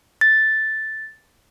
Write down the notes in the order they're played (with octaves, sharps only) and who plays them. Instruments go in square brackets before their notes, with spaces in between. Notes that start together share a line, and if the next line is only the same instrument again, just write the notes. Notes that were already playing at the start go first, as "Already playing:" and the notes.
[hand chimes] A6